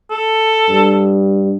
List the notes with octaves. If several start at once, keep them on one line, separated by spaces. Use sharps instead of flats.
A4
G2